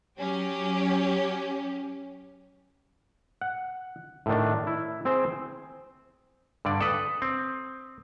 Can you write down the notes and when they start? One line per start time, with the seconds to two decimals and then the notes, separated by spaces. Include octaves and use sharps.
0.18 F#3 C#4 G4
3.41 F#5
4.26 A2 D#3 D4
4.67 E4
5.05 C4 G#4 C5
6.65 G2 D3 D5
6.81 A4 B4 D6 D#6
7.22 C4